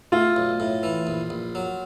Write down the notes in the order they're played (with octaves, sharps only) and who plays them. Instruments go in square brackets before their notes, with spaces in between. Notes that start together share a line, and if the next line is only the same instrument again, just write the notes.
[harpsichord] A3 [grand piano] F4
[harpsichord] B1
A2
E3
A#1
A#1
F#3